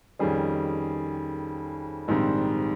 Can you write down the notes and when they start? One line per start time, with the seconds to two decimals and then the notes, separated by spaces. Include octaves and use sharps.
0.19 F2 D#3 G3 C#4 G#4
2.08 A#1 G#2 D#3 G3 C4